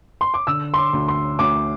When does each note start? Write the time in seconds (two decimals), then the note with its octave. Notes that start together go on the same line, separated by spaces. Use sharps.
0.21 C6
0.34 D6
0.47 D3 E6
0.74 C6
0.78 D6
0.93 D2
1.08 C6
1.39 D2 D6